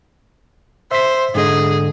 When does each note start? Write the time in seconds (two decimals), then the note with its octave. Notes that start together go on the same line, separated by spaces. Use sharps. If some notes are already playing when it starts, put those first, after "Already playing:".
0.91 C5 E5 B6
1.35 G#2 D3 G#4 D#5